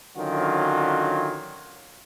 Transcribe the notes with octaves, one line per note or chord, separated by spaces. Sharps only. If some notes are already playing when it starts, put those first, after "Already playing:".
D3 D#3 F#3 C#4 F4